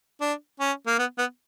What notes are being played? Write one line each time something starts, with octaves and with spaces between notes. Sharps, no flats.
D4
C#4
A#3
B3
B3